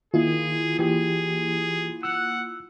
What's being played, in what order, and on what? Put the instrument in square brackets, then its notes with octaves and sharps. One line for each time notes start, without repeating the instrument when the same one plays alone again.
[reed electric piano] D#3 [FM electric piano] A#3 E4 F4 [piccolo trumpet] G#4
[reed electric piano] E3 G4 [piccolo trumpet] G#4
[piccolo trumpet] F#5 [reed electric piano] E6 F#6